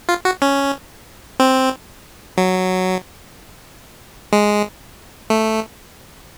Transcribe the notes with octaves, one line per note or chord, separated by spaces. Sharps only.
F4
F#4
C#4
C4
F#3
G#3
A3